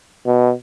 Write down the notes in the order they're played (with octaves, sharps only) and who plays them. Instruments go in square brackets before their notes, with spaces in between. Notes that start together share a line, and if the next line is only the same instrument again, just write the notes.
[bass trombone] B2